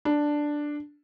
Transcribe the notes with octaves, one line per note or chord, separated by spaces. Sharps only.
D4